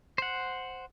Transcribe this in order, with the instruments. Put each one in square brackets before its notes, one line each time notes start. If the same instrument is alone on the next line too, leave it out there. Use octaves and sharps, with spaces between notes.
[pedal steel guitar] C5 F#5